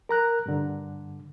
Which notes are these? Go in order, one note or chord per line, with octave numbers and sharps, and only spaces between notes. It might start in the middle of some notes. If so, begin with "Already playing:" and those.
A#4 A#5 F#6
G2 D3